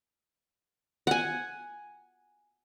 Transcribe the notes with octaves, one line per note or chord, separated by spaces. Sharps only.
F#5 G#5